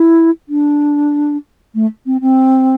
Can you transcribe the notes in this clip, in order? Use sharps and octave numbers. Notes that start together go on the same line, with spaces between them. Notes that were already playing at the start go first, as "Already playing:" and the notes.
Already playing: E4
D4
A3
C4
C4